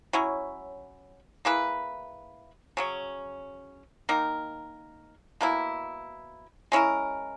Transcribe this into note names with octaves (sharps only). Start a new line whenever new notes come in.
F#3 C#4 E4
A#3 E4 G#4 B4
C#3 F#3 C#4
D#3 A#3 D#4 A#4
B2 A#3 E4
G#3 C#4 E4 A#4